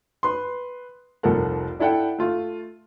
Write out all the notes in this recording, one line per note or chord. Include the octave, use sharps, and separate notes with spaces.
B4 C6
F1 C2 F3 A4 A#4 F#5
D4 E4 A4 F#5 G5
A3 F4